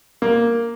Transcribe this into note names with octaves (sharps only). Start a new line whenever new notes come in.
A#3